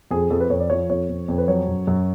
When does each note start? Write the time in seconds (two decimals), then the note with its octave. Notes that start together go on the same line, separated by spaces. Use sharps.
0.11 F2 G#4
0.30 F2 A4
0.40 B4
0.50 F2 C#5
0.60 D5
0.70 F3 C#5
0.89 F2 C#5
1.09 F2
1.28 F2
1.38 B4
1.48 F#3 C#5
1.68 F#2
1.87 F#2